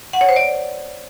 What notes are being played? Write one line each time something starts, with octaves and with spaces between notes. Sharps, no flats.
F#5
C#5
C5
D5